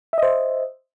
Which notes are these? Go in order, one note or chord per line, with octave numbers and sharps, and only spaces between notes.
C5 D#5 E5